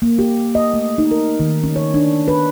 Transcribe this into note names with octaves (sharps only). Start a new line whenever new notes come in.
A#3
G4
D#5
A3
D#4
A#4
D#3
C#4
C#5
D4
B4